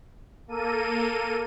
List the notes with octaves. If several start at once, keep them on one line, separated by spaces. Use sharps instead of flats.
A#3 A4 A#4 D#7